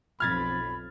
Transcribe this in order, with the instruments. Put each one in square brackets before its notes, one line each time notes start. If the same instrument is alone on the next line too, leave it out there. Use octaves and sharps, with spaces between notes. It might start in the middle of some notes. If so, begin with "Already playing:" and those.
[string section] B1 F2 [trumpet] B5 [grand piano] F6 G#6 A6